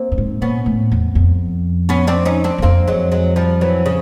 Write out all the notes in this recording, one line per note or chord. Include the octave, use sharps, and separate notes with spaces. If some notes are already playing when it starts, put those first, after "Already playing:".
Already playing: A#3 C4
G2
G#2
A#2 B3 C#4
A2
E2
F2
B3 C#4
C4 D4
C#4 D#4
C4 D4
E2
F2 A#3 C4
F#3 G#3
F#3 G#3
F3 G3
E3 F#3
C#3